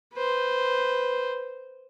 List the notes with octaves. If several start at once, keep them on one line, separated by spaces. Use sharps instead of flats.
B4 C5